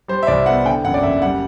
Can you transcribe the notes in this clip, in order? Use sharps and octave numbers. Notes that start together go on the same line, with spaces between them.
G3 C5
E5
C2 D5
B3 F#5
D3 G5
F#1 F#5
D5
F#1 E5
G3 F#5